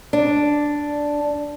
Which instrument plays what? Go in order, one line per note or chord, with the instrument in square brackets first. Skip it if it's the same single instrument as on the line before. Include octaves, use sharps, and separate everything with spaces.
[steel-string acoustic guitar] D4